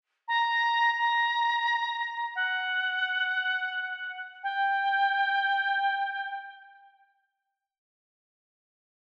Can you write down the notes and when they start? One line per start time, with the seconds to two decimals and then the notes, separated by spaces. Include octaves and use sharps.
0.28 A#5
0.98 A#5
2.35 F#5
4.43 G5